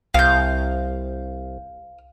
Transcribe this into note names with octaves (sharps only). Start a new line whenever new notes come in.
C2 F5 G6